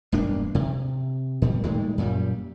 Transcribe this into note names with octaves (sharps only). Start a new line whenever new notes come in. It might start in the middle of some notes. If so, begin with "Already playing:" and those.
E1 G2 A#3 D4
C3
A#2 G3
A2 D#3 G3 G#3
F#2 A#2 G3